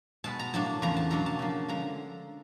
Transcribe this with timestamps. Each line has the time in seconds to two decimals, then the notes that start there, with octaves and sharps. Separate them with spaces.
0.24 B2 G#3 B3 A5
0.39 A#5
0.53 A2 F#3 A#3 D4 A5
0.82 E2 C#3 F3 A#5
0.97 A5
1.10 B2 F#3 A#3 D4 A#5
1.26 A5
1.39 C#3 F3 A#3 D4
1.68 D3 F3 G#3 A#5